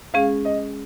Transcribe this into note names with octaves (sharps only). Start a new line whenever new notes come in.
G#3 C#4 G#4 F5
D#5